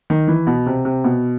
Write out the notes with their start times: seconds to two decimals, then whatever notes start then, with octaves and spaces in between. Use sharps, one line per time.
0.10 D#3
0.28 E3
0.47 B2
0.66 C3
0.85 C3
1.04 B2